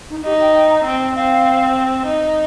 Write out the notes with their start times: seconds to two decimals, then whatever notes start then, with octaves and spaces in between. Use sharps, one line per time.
0.09 D#4
0.24 D#4 G4
0.40 G5
0.54 G5
0.69 A#5
0.84 C4 G5
1.15 C4 F5
2.05 D#4